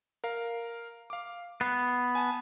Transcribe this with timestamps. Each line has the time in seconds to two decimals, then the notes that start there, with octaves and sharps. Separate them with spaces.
0.24 A#4 F5
1.10 F5 D6
1.61 B3 C7
2.15 G#5 A5